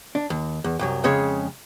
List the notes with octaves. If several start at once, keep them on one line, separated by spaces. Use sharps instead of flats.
D4
D#2
E2
C2 F#2 F#3
F2 C#3 G#3 C#5